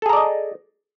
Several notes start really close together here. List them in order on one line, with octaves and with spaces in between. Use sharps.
A4 G#4 A#5 D5 D#5